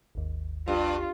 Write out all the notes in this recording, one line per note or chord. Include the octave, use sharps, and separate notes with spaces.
G#1 D#2
G2 F4